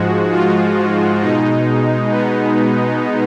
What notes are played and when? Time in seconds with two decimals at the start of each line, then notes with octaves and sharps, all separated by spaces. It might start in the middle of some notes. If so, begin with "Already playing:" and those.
Already playing: G#2 F3 G#3 F#4
0.31 F4
1.20 B2 G#3 D#4
2.11 B3